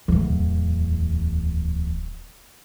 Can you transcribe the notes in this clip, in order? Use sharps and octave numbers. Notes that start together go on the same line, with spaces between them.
D1 E2